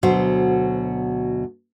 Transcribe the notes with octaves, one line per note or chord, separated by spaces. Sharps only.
D2 B2 F#3 F#4 C5